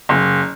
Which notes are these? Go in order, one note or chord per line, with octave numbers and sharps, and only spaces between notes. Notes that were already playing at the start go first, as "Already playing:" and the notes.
F#1